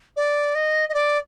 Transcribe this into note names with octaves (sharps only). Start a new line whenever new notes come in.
D5
D#5
D#5
D5